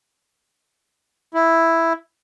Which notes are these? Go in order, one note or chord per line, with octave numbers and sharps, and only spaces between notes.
E4